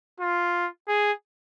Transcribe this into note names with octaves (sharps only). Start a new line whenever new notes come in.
F4
G#4